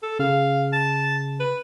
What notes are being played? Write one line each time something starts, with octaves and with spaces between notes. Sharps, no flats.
A4
C#3 F5
A5
B4